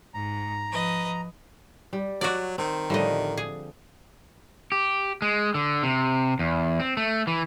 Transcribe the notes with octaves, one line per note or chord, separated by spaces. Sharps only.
G#2 A#5
F3 B4 D#5
G3
F#3 F#4 D5
D#3 C4
A2 D3 F3 G3 D#5
G#4
G4
G#3
D3
C3
E2
C4
A3
E3